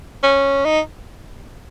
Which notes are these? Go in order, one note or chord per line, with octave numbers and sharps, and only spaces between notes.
C#4
D#4